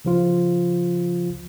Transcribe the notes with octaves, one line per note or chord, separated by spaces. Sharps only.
C#3 F3 F4